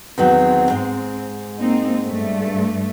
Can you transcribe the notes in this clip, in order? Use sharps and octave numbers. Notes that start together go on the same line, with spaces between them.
E2 D#3 F#3 C4
G#2
A#3 C4 D#4
G2 A3